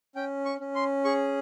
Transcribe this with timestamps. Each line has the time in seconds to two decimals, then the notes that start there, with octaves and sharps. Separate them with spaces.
0.15 C#4 G5
0.45 C#6
0.60 C#4
0.75 C6
1.05 G#4 C#6